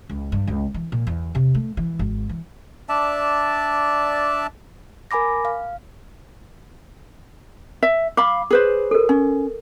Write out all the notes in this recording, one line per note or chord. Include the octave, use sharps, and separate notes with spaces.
C#2
G2
C#2
E3
A#2
E2
C3
A3
E3
G#1
E3
D4 D5 E5 A5
A#4 G#5 B5 D6 A#6
F5
E5
F5 B5 D6
G#4 B4 C5
A4 A#4
C#4